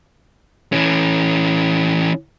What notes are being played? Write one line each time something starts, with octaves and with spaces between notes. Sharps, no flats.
E3 C#4